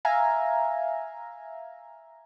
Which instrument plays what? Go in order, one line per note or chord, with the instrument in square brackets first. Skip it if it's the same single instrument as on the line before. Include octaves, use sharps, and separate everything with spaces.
[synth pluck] E5 F5 G#5 A#5